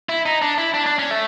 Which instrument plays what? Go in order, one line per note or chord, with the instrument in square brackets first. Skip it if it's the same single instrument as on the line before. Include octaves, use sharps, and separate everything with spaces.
[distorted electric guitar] E4
D#4
D4
E4
D4
D4
C#4
A3